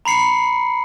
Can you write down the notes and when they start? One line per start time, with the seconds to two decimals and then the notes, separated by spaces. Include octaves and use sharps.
0.05 A#5 B5 C7 C#7